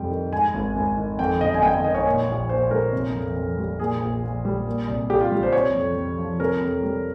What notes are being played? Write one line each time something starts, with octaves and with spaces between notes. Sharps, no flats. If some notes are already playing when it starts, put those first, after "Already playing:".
Already playing: F2 C3 G3 G5
D#3
G#2 G#5
G#1
G#1
D#3
F2 G5
G1 D#5
G#5
G1 G5
G5
D#3 D#5
C#5
A#2
A#1
A#1 C5
G3 A#4
C3
F2
F2
G3
A#2 G#4
A#1
A#1
G3
A#2
C2
C2 G4
F4
G3
C5
C3 C#5
F2
F2
F3
C3 A#4
F2
G3